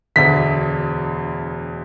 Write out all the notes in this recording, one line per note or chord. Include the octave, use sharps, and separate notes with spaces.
E1 D2 D3 B6